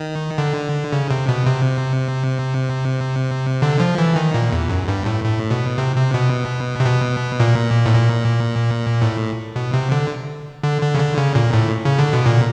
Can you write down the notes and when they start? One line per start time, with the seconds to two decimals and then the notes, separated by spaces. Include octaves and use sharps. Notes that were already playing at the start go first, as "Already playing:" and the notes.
Already playing: D#3
0.38 D3
0.92 C#3
1.11 C3
1.29 B2
1.47 C3
3.62 D3
3.80 F3
3.98 E3
4.16 D#3
4.34 A#2
4.52 E2
4.70 F#2
4.88 G2
5.06 A2
5.24 A2
5.51 B2
5.78 C3
5.96 C3
6.14 B2
6.80 C3
6.86 B2
7.40 A#2
7.86 A2
7.94 A#2
9.02 A2
9.56 B2
9.73 C3
9.92 D3
10.63 D3
10.82 D3
10.94 C#3
10.99 D3
11.17 C#3
11.35 A#2
11.53 A2
11.85 C#3
11.99 D3
12.13 B2
12.26 A#2